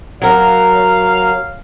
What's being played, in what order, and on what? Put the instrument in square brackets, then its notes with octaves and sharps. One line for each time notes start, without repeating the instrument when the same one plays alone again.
[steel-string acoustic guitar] F#3 A#4 [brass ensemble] C#5 F5